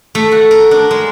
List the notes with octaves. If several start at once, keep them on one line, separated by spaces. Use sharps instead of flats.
A3
F#4
A#4
D4
G#3